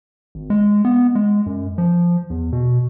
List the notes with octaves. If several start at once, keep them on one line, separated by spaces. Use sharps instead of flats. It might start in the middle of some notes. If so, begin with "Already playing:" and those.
G#1
G#3
B3
G#3
F#2
F3
E2
B2